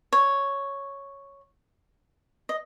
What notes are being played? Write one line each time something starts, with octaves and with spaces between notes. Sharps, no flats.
C#5
D#5